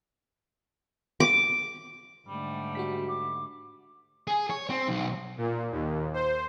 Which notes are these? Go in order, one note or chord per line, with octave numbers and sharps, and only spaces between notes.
D6
G#2 D3 G3 A3
F#4 G4 B6
D6
G#4
C#5
C4
B1
A#2
D#2
C5